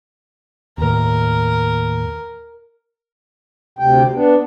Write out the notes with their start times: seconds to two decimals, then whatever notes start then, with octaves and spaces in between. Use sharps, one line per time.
0.78 D#2 A2 A#4
3.79 D2 C3 G5
4.14 B3 D4